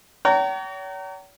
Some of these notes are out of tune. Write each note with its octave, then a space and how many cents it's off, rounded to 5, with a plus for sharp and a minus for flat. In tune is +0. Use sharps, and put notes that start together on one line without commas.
C#5 +40 G5 -45 A#5 -20